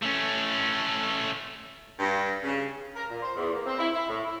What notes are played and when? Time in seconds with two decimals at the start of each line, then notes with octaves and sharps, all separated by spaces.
0.03 A3 C#4
1.99 G2
2.43 C#3
2.95 A#4
3.10 A#2
3.22 C5
3.36 E2
3.53 A#3
3.66 C4
3.78 E4
3.93 E4
4.08 A2
4.24 E4